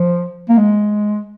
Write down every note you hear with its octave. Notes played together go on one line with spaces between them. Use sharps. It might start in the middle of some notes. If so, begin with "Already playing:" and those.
Already playing: F3
A#3
G#3